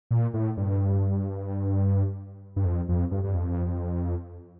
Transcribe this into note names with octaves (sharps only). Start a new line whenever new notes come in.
A#2
A2
G2
G2
F2
F2
G2
G2
F2